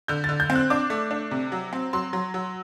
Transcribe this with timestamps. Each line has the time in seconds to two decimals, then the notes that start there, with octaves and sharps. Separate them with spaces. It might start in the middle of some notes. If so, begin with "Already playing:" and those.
0.08 D3 G6
0.24 A6
0.29 D3
0.40 G6
0.50 C4
0.56 F#6
0.70 D4 D6
0.90 A3
1.11 D4
1.31 C3
1.52 F#3
1.73 C4
1.93 F#3 C6
2.13 F#3
2.34 F#3